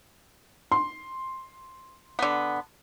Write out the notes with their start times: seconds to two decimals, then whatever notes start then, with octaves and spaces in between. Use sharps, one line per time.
0.72 C6
2.19 D3 B3